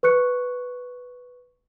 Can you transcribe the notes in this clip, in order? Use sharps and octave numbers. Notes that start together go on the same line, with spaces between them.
B4 C#6 F#6 C#7